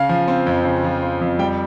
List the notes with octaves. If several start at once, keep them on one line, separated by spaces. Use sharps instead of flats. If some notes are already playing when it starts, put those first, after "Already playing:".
Already playing: C#3 F5
F3
C4
F2
C#3
F3
C4
F2
G3 G5